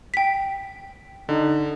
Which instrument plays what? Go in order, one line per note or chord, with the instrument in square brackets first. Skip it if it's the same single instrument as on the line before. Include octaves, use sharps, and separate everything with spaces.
[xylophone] G5 B6
[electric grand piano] D3 [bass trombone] D#4